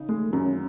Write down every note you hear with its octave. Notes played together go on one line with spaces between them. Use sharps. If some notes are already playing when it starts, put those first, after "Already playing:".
Already playing: C#3 D#4
G#3 A3
F#2 C#4